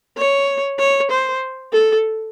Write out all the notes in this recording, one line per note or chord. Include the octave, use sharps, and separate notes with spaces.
C#5
C#5
C5
A4